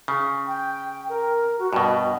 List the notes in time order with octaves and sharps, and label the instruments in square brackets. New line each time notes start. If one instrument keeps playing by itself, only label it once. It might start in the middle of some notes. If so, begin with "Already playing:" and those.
[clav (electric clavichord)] C#3
[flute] G5
A#4
F#4
[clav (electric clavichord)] G2 B2 [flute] D#5